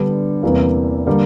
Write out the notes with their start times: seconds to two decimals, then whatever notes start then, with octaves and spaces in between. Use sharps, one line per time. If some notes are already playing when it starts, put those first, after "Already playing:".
Already playing: D3 G3 B3 D4
0.43 E2 C3 E3 G3 A#3
1.07 D3 G3 A#3